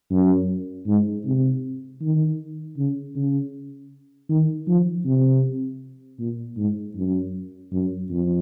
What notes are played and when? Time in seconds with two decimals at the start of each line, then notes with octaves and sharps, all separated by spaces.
0.11 F#2
0.87 G#2
1.26 C3
2.01 D#3
2.77 C#3
3.15 C#3
4.30 D#3
4.68 F3
5.05 C3
6.19 A#2
6.57 G#2
6.96 F#2
7.72 F#2
8.10 F2